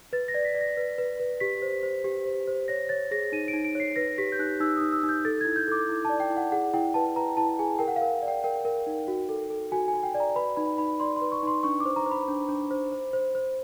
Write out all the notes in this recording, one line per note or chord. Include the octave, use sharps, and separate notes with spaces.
B4 A6
A#6
D5
B6
D5
A#6
B4
B4
B4
G4 B6
C5
C5
G4
C5
C5
C#5 A#6
C#5 A6
G#4 A#6
D#4 D#7
D7
D#4
D7
C#5 C7
B4 A#6
G4 B6
G6
D#4 F#6
D#4 E6
D#4 D#6
E6
D#4
G6
A4 A6
E4 G#6
G6
A4 D6
E4
D5 A5
G5
E4
F#5
G#4 F#5
E4 G5
B4 A5
B4 A#5
E4 A5
G#4 G#5
A#4 G5
F#5
F5
A#4
D5
G5
A#4 G5
A#4
D#4
F#4
A4
A4
F#4 G#5
G#5
F#4
G5
D5
A#5
B4 B5
D#4 B5
D#4 B5
D5 C6
C6
B4
C#6
D#4 C6
D4 C#6
D6
C5
A#5
C5
B5
D4
D4
C5
C5
C5
C5